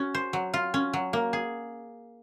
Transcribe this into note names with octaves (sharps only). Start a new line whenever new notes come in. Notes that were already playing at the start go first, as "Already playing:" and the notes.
Already playing: C#4 F#4
C5
F#3
F4
C#4
F#3
A#3
G#4